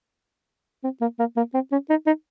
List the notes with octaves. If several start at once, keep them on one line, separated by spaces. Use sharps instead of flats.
C4
A#3
A#3
A#3
C4
C#4
D#4
D#4